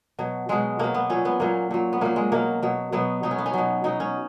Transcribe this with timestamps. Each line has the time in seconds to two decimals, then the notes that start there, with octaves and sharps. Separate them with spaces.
0.19 B2 F#3
0.49 B2 F#3 G#3
0.79 B2 F#3 A#3
0.94 B3
1.09 A#2 F#3 C#4
1.25 B3
1.40 A#2 F#3 A#3
1.71 A#2 F#3
1.93 B3
2.01 A#2 F#3 A#3
2.16 G#3
2.32 B2 F#3 A#3
2.62 B2 F#3
2.92 B2 F#3 B3
3.23 B2 F#3 D#4
3.31 C#4
3.38 B3
3.46 C#4
3.53 B2 F#3
3.84 B2 F#3 D#4
4.00 C#4